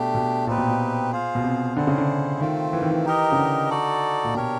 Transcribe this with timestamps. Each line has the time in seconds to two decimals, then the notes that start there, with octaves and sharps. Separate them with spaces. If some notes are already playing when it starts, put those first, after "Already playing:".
Already playing: B2 A3 D4 G4
0.15 B2
0.47 A#2 C4 D#4 G4 B4
0.58 B2
0.69 A#2
1.12 F4 G#4 C5 F5
1.35 B2
1.44 C3
1.76 D3 C4 E4 G#4 C5
1.87 C#3
1.98 D3
2.41 D#3 A3 C4 F4
2.73 E3
2.82 D#3
2.91 E3
3.05 D#4 G4 A#4 D#5
3.32 C#3
3.37 D3
3.70 D#4 F#4 A4 D5
4.24 A#2
4.34 B2 D4 G4 A#4 C#5